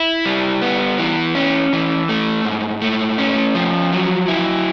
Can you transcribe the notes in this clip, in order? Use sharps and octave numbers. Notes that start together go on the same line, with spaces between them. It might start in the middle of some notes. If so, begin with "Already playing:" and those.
Already playing: E4
G3
B3
E3
C#4
E3
A3
G#2
A3
C#4
F3
F#3
E4